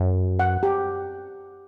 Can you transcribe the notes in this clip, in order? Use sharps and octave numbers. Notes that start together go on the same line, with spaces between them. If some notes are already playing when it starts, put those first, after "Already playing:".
Already playing: F#2
F#5
G4